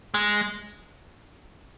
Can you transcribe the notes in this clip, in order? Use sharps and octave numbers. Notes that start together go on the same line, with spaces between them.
G#3